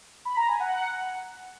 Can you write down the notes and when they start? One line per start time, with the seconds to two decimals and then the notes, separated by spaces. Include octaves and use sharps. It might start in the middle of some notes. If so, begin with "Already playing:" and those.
0.25 B5
0.37 A#5
0.48 G#5
0.60 F#5